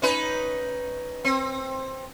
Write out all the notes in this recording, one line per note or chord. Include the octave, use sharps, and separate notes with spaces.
C#4 D#4 B4
C4